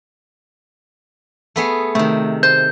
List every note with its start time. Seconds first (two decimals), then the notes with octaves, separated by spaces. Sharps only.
1.56 A3 B3 G#4
1.95 C3 D#3 A3
2.43 C5 C6 G6